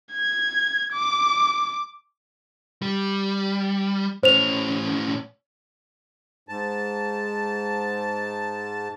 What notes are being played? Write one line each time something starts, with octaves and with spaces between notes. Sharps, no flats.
G#6
D6
G3
A2 C#4 C5 F7
G#2 A5